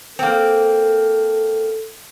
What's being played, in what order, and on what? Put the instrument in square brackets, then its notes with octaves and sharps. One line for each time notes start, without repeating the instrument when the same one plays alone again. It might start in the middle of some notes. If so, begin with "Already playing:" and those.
[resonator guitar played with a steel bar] A#3 C4 [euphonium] A4